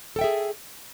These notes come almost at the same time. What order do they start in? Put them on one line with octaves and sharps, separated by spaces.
A4 G5 E5 G#4